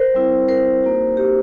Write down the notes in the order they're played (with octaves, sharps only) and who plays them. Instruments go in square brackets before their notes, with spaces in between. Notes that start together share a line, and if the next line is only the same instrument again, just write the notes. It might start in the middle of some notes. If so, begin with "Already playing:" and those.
Already playing: [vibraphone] A#4 C5
G3 C4 E4
A#4 C5
A#3 D#4 F#4
G4